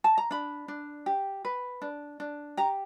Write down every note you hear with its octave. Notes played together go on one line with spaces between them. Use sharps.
A5
A#5
D4 B5
D4
G4
B4
D4
D4
G4 A#5